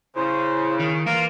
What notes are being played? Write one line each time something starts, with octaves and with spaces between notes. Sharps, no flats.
C#3 E4 C5
D#3
E3 A#3 F4 F5 A#5